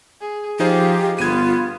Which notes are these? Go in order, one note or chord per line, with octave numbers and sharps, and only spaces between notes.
G#4
F3 D#4 F4 G4 G#4 C5
G1 B3 F4 G#6 D#7